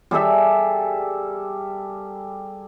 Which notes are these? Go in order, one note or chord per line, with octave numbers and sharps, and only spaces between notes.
G3 G#4 A4 E5